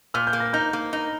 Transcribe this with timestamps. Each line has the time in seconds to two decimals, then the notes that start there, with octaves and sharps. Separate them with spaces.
0.14 A#2 F6
0.27 G6
0.33 A#3
0.40 A#6
0.53 D#4 G6
0.73 A#3
0.93 D#4